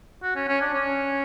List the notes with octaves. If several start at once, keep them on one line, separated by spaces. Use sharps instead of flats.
F#4
C#4
C#4
D4
C#4